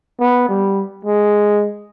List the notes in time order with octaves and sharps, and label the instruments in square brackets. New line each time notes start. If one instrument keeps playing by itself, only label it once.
[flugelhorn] B3
G3
G#3